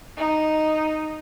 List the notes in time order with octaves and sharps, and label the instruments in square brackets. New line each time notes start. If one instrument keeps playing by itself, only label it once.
[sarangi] D#4